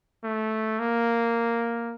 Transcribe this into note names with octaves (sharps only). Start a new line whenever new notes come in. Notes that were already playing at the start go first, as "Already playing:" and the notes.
A3
A#3